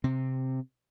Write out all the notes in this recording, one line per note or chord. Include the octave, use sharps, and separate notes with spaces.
C3 C4